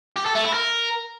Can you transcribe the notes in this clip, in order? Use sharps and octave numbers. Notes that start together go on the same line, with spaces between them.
G4
A4
A3
E4
A#4